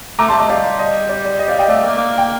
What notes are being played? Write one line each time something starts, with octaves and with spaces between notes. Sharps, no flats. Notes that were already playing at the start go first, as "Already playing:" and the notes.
A3 A#5 D6
G3 A5 C6
A3 D#5
G3 D5 F5
D#5
D5
D5
D#5
D5 F5
D#5 G5
A3 D5 F5
A#3
A#3
G5